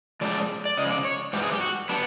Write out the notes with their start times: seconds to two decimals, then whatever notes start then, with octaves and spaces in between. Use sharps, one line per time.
0.21 A2 F3 G#3 C#4 D5
0.65 D5
0.77 C#3 F3 G#3 D#5
0.91 D5
1.05 C#5
1.33 G#2 E3 G3 G4
1.42 G#4
1.52 G4
1.61 F#4
1.89 G3 B3 D4